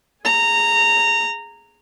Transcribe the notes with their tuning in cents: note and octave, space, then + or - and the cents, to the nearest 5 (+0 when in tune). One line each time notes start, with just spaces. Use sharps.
G#4 -5 A#5 -15